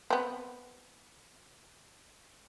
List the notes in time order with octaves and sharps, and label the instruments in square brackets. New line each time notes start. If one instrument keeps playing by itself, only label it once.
[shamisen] B3 C4